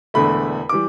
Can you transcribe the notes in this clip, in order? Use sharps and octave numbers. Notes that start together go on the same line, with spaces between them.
E1 E2 D3 A3 B5
E3 G3 D6